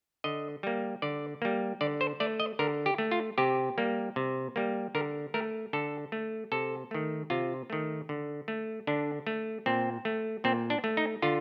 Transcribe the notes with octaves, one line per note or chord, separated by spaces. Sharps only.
D3 D#5
G3 A#3
D3 D5
G3 A#3
D3 D5
C5
A3 D5
D#5
D3 A#4
G4
A3
F4
C3 G4
G3 A#3
C3
G3 A#3
D3 A#4
A3 A#4
D3 A4
A3
C3 A4
D#3 A3
C3 F4
D#3 A3
D3
A3
D3 D4
A3
A#2 C4
A3
A#2 C4
D4
A3
D#4
D3 F4